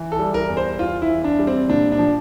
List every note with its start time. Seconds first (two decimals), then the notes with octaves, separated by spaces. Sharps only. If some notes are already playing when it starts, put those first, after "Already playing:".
Already playing: E3
0.12 A4
0.19 G3
0.34 A#4
0.49 E2
0.57 C5
0.79 E2 F4
1.02 E4
1.09 E3
1.24 D4
1.39 G3
1.47 C4
1.69 A#2 D4
1.92 D4
1.99 F3